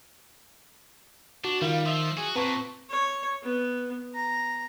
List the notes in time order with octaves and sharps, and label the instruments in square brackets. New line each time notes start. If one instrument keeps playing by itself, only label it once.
[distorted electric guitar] D4 [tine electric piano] F#4
[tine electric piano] D#3 [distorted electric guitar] G3 [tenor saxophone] F4
[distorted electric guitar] F3 [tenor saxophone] E5
[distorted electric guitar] F#4 [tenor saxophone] G#4
[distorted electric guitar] A#2 [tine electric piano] C4 A5 C#6 [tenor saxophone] B4
[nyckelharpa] C#5
B3
A#5